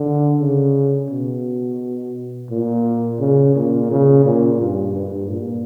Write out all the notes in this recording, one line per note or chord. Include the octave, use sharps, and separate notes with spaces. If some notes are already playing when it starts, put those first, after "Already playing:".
Already playing: D3
C#3
B2
A#2
C#3
A#2
C#3
A#2
G2
G2
A#2